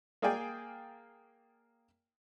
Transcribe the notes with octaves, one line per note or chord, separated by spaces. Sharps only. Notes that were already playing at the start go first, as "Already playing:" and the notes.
A#3 G#4 D5 F5 G5 G#5